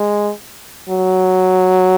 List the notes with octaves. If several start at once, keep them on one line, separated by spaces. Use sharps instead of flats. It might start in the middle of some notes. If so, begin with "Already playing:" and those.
Already playing: G#3
F#3